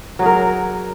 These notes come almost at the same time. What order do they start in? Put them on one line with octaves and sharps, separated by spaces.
F#3 G#4 A#4